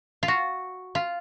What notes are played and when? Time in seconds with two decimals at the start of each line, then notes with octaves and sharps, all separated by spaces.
0.23 F4
0.28 F#4
0.95 F4